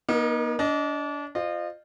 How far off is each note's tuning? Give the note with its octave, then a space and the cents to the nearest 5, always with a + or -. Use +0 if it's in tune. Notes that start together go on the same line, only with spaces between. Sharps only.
A#3 +45 D#4 +0 A#4 +0
D4 -30 D#5 +0
F4 -5 C5 +0 D#5 -35